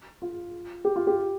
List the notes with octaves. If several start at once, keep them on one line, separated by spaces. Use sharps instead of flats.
F4
G4
F4
G4